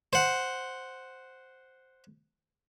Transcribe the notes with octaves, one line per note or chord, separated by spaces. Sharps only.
C5 F#5